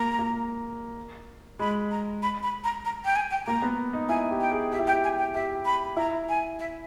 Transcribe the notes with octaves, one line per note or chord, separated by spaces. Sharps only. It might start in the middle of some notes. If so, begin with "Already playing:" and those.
Already playing: A#3 A#5
A#3
G#3 B5
A#5
B5
B5
A#5
A#5
G5
G#5
G5
A#3 A#5
B3
D#4
E4 G#5
G4
G5
G#4
G4 E5
E4
G4 G5
G#5
G5
G4 E5
B5
E4 A#5
G#5
E5